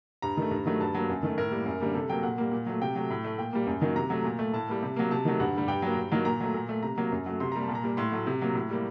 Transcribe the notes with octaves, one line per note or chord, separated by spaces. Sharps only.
G2 A#5
D#3 A3
G2
D#3 F#3 A3
G2 A5
F#3 A#3
F#2
D#3 A3
A2 A#4
G3 A#3
F#2
D3 G3 A#3
C3 A4
F#3 A#3 G5
A#2 F#5
G3 A#3
A#2
F#3 A3
C3 G5
F#3 A3
A2
A3
A#2 G5
G3 A#3
F#2
D#3 F#3 A#3
C3 A#5
F#3 A3
A#2
A3
A2 A5
G3 A#3
C3
F#3 A#3
C3 A5
D#3 F#3 A3
G2 F#5
D3 G3
G2 G5
F#3 A#3
G2
D#3 F#3 A#3
A#2 A#5
F#3 A3
A#2
A3
C3 A#5
F#3 A#3
F#2
F#3 A3
C3 C6
G3 A#3 A#5
A5
A#2
A#5
G3 A#3
A2 C6
F#3 A3
C3
F#3 A#3
A2
G3 A#3